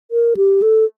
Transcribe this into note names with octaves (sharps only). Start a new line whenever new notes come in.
A#4
G4
A4